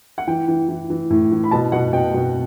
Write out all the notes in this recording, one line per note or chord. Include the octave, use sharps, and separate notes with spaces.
F#5
E3 G5
E3
E3
E3
A2
E3
B5
B2 A5
B2 F#5
B2 G5
B2